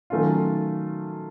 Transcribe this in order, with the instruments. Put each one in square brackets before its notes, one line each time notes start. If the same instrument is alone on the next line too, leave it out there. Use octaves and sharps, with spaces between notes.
[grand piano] D#3 F#3 A3 C#4 F4